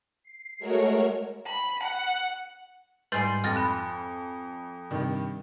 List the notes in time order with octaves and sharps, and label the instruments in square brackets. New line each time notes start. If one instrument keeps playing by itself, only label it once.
[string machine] C7
G#3 A3 F#4 A#4 C#5
[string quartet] B5
F#5
[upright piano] G#2 G3 [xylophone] B4 G6 A6 [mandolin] D5 G#5 C6
[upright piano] F2 [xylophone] F6 A6 A#6
[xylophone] B5 F#6
[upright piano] G2 C3 D#3